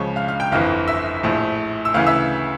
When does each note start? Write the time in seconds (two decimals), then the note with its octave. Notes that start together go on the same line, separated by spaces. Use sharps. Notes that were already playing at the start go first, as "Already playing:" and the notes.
Already playing: C#2 C#3 F3 C#5 C#6
0.16 F5 F6
0.28 F5 F6
0.40 G5 G6
0.52 G1 F2 E3 F5 F6
0.88 E5 E6
1.23 A#1 A2 F3
1.85 E6
1.94 D2 C#3 E3 F5 F6
2.06 E5 E6